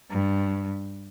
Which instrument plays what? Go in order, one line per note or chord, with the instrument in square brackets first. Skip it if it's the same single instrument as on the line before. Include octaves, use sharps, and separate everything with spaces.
[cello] G2